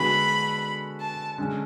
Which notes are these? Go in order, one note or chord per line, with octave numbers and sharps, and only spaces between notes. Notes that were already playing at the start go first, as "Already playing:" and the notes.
Already playing: D3 G#3 B3 F#4 B5
A5
D3 G#3 C#4